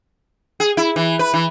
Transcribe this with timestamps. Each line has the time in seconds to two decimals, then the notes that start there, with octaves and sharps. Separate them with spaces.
0.60 G#4
0.77 E4
0.96 E3
1.19 B4
1.34 E3